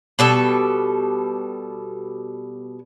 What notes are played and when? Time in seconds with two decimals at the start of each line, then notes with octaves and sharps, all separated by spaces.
0.19 B2 G3 A4